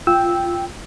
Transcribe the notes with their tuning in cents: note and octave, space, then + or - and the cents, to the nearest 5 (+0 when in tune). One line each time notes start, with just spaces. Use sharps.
F4 -10 G5 +0 E6 -10